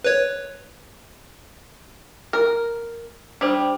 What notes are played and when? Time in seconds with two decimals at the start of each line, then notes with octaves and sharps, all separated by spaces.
0.04 B4 C#5
2.33 A#4
3.41 G3 D4 C5